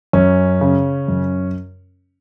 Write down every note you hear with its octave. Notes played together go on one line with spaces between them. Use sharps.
F#2 C#4
C#3
F#2